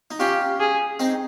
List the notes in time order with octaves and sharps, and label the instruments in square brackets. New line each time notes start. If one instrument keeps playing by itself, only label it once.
[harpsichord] D#4
[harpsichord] C#4 F4 [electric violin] G4
[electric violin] G#4
[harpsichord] C4 D#4